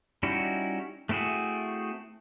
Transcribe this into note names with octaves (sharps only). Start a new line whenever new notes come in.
G3 C#4 D#4 E4 F#4
A3 C4 E4 F#4 G#4